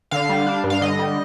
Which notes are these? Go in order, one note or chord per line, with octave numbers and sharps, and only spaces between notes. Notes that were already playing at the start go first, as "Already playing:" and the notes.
D3 F5
G3
D4
G2
F5
D3 D#5
G3